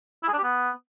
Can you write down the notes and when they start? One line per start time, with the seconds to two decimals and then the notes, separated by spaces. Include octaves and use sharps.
0.23 E4
0.28 G#4
0.33 D4
0.38 G4
0.43 B3